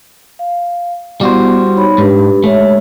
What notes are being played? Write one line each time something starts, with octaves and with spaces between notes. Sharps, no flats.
F5
G3 B3 E4 F#4 C5
D#4 C#5 B5
G#2 D4 G4 B4
G#3 A3 C#5 E5